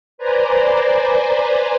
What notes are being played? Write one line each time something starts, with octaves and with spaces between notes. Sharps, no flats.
B4 C5 D5 G#5 A#5